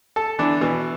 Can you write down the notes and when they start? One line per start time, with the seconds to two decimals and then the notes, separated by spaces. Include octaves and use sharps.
0.16 A4 A5
0.39 D3 E3 B3 D4
0.61 B2 E3 E6